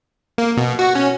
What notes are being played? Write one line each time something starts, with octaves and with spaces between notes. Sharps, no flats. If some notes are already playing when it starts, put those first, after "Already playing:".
A#3
B2
F#4
C#4